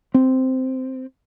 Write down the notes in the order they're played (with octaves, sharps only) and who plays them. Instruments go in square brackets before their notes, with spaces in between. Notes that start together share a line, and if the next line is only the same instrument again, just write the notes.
[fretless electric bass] C4